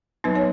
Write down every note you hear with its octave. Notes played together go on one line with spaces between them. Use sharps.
F#3 B3 D#4 B4
C#5